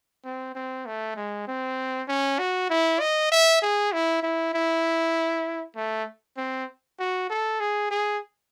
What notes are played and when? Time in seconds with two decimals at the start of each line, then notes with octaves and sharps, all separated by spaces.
0.25 C4
0.55 C4
0.86 A3
1.16 G#3
1.47 C4
2.08 C#4
2.39 F#4
2.70 E4
3.00 D#5
3.31 E5
3.62 G#4
3.92 E4
4.23 E4
4.54 E4
5.76 A3
6.37 C4
7.00 F#4
7.30 A4
7.60 G#4
7.91 G#4